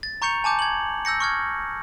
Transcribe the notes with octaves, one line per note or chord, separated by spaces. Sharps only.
A6
A#5 C#6 G6 C#7 F7
G#5 A5 D6 G6
G#6 F#7
E6 G6 A#6 C#7
C#6 F6 G#6